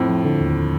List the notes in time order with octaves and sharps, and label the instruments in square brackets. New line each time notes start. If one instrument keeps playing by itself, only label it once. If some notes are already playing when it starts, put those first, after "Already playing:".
Already playing: [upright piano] F2 A2 [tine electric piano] C4
[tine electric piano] F3
D3
D#2